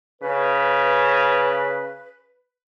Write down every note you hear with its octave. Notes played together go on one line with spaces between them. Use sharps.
C#3 B4